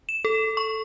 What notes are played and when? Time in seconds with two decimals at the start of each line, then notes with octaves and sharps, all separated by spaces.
0.09 E7
0.25 A4
0.57 C#6